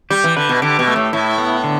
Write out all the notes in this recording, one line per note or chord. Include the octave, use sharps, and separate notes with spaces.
G3 G4
E3
D3 B4
B2
D3 G4
B2
A3
A2
A2 E4
B3
D3